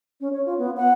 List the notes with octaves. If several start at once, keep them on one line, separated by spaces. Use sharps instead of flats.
C#4
C#5
F4
B3
F#5